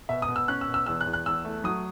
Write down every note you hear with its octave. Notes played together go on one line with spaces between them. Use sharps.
B2 E5
D#6
B2
E6
C#4 F#6
E6
B2
E6
E2 E6
F#6
E2
F#6
E2 E6
A3
F#3 D#6